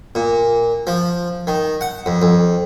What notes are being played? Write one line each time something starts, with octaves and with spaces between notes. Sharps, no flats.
A#2
F3
D#3
F#5
F2
F2